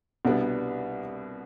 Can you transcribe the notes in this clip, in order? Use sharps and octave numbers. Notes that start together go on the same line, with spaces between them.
C2 B2 G3 B3 D4